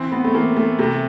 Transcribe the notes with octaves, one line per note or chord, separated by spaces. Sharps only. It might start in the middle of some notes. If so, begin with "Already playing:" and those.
Already playing: E3 C4
A2 B3
A3
E3 A#3
E3 A3
C3 A3